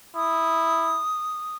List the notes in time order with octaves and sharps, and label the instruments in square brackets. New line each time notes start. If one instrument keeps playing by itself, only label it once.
[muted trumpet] E4 [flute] D#6